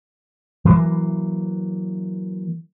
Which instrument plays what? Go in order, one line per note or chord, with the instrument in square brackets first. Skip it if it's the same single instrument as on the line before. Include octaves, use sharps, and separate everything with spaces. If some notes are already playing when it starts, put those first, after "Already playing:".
[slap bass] E3 F#3 A3 A#3